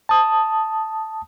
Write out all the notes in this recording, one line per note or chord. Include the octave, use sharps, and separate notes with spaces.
A5 D#6